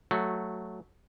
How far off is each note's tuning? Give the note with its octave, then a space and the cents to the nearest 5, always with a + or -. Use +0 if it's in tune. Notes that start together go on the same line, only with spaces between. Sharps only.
F#3 +0 A3 +0 F#4 -20